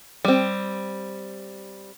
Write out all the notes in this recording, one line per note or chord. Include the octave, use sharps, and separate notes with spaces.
G3 C4